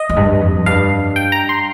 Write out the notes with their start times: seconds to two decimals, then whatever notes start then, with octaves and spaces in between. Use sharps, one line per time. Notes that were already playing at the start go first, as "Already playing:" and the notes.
Already playing: D#5
0.09 F2
0.16 G2
0.41 F2
0.66 G2 F5
1.16 G5
1.32 A#5
1.49 C6